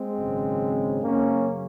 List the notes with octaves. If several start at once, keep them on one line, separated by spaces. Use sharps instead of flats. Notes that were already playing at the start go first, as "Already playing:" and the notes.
Already playing: G#3 C4
G#1 F#2 C#3
F#2 C#3 F#3 A#3 C#4